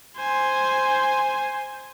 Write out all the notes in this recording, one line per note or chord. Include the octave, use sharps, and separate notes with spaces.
C5 G#5